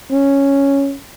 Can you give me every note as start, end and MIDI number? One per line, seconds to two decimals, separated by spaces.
0.11 0.96 61